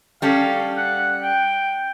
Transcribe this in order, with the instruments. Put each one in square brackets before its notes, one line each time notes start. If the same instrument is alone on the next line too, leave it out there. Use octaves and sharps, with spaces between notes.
[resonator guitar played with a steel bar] G3 C#4 A4 [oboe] F5
[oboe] F#5
G5